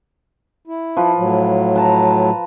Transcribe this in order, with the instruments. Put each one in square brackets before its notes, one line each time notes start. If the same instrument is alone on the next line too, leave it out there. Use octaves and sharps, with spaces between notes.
[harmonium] E4
[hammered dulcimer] F3 B4
[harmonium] A2 F#3
[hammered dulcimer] B4 A5 A#5